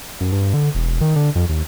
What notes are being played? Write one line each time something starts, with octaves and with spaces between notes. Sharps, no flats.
F#2
G2
D3
E1
D#3
D3
F2
D#2